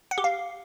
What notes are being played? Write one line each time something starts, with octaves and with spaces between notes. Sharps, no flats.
F#5
G4
F5